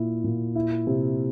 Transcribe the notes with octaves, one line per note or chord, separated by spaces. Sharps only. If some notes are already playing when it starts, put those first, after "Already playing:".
Already playing: A#2 E4
A#2
E4
C3